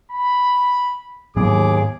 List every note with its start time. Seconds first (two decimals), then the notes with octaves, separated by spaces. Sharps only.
0.12 B5
1.36 D#2 G#2 F#3 B3 G#4 D6